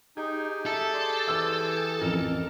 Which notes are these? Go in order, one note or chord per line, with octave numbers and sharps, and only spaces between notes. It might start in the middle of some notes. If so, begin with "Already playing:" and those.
D#4 G4 G#4
A4 E5
D5 A5 C6
E3 E6
A1 F2 A#4